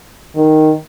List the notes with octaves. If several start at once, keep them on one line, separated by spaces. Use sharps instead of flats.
D#3